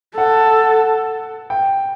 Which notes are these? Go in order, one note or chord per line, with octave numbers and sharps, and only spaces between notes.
A4 F#5
G5